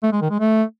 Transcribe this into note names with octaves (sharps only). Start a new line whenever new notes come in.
A3
G#3
D#3
G#3
A3